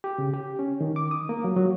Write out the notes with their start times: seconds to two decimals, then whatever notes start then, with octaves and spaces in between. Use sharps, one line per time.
0.04 G4
0.18 C#3
0.34 G4
0.59 C#4
0.81 D#3
0.96 D6
1.11 D#6
1.29 A#3
1.44 F#3
1.57 F#3